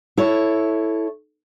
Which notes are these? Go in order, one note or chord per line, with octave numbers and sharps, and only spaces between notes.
E4 A4 C#5